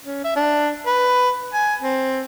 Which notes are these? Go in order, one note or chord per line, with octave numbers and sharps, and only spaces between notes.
C#4
E5
D4
B4
G#5
C4